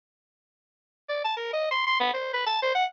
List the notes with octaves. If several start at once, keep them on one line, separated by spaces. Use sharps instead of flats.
D5
A5
A#4
D#5
C6
C6
B3
C5
B4
A5
C5
F#5